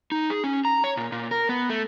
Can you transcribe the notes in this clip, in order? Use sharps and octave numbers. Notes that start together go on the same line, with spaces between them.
D#4
G#4
C#4
A#5
C#5
A#2
A#2
A#4
B3
A3